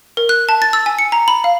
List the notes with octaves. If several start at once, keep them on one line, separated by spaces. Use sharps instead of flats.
A#4
F#6
A5
A6
E6
G#5
C#7
A#5
B5
F5